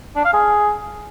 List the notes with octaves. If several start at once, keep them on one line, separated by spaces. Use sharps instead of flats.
D4
F5
G#4